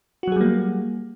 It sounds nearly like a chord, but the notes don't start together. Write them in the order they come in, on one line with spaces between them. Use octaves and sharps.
F#4 F#3 G#4 G3 A#3